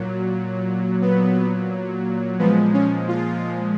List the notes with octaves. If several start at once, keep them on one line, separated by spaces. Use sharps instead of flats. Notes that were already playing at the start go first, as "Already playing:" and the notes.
Already playing: A#2 F#3
B3
A#2 F3 G#3 B3
C#4
F4